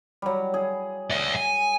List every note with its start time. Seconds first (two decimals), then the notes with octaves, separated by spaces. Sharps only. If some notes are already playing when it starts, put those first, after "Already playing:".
0.22 F#3 G3
0.54 G#4
1.10 D5 E5
1.35 G#5